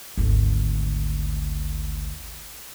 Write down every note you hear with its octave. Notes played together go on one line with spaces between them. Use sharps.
G#1 D2